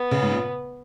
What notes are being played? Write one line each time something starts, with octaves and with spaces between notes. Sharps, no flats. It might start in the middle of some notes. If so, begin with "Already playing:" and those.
Already playing: B3
C#3
G#2
A#2